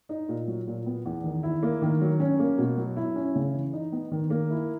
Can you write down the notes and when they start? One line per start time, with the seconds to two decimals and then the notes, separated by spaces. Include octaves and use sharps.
0.09 D#4
0.29 A#2
0.48 F#3
0.67 A#2
0.86 B3
1.05 E2
1.24 D#3
1.43 E4
1.63 A#3
1.82 D#3
2.01 F#3
2.20 C#4
2.39 A#3
2.58 B2
2.77 F#3
2.97 E4
3.16 C#4
3.36 C#3
3.54 E3
3.73 D#4
3.92 B3
4.11 D#3
4.30 A#3
4.50 E4